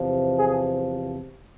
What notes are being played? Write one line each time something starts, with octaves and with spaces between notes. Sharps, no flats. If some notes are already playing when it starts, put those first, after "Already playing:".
Already playing: E2 C3 F3
G#4